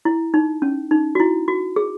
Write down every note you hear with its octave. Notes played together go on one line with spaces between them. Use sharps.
E4
D#4
C#4
D#4
F#4
E4
F#4
G#4